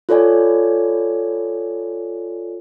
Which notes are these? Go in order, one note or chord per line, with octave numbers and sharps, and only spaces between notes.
F4 A4 C#5 D5 G#5